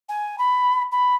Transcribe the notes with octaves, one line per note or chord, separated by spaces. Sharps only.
G#5
B5
B5